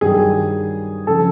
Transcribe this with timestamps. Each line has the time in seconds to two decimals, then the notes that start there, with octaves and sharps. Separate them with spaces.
0.01 G2 D#3 F#3 G#4
1.07 C#3 F3 A4